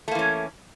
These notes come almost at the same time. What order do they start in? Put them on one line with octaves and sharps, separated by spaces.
A3 A#3 E3 C#4